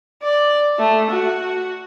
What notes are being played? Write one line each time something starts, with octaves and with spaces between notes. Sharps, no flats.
D5
A3
F#4